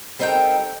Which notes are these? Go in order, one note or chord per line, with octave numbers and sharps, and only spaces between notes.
G3 C4 D#4 A4 A#4 G5